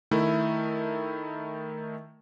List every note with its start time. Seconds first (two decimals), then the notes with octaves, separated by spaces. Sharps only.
0.11 D#3 A3 E4